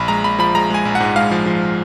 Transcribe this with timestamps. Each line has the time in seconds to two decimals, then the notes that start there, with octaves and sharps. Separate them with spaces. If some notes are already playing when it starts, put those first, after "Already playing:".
Already playing: A#1 B5
0.08 G#3 A#5
0.24 A#1 B5
0.39 F3 B5
0.55 G#3 A#5
0.70 G#3 G#5
0.85 A#1
0.95 F#5
1.00 G#2
1.16 G#3 F5
1.31 F3
1.46 F3